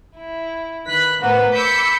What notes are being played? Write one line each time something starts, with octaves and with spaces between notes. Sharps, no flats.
E4
D#3 B4 F#6 B6
A2 A#3 B3 B4 C5 F#5
B5 D6 E6 G6 C#7